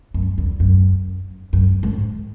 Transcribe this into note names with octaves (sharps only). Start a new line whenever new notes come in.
F#2
E2
F#2
F#2
G#2